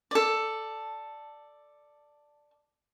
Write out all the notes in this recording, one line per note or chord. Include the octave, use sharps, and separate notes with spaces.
A4 D5